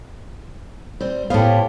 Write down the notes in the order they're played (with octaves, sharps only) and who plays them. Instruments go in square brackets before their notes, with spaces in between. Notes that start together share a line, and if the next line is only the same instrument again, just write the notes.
[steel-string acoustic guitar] G3 C4 C5
[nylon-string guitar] A2 F5 [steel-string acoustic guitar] B3 C5 C#5 [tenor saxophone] G4